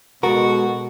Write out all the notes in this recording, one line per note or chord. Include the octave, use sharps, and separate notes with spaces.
B2 G#3 F#4 A4 A#4